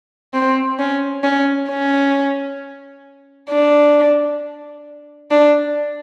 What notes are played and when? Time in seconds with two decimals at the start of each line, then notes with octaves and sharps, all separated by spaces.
0.34 C4
0.79 C#4
1.24 C#4
1.69 C#4
3.50 D4
5.31 D4